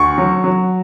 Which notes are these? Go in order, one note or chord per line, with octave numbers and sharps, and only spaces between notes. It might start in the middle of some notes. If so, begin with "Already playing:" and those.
Already playing: D2 C#6
F#3
F#3